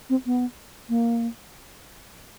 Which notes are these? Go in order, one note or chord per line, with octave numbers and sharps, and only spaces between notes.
C4
B3
A#3